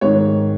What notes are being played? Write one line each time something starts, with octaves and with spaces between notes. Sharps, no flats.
G#2 D#3 C#5